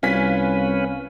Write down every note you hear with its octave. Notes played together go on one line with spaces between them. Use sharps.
C2 C#4 F4 B4 G#5 B6